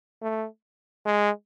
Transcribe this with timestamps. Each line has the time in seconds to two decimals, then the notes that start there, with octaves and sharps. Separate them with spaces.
0.22 A3
1.05 G#3